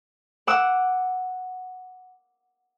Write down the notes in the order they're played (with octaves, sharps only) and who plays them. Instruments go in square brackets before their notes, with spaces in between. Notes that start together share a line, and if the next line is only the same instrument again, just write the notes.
[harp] F#5 D6 E6